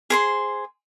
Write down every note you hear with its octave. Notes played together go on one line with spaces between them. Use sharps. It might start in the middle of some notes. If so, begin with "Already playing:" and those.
G#4 C5 C6